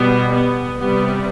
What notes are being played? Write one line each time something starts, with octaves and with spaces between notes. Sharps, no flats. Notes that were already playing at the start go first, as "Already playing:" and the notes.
Already playing: B2 G3 B3
B3
C3 G3 B3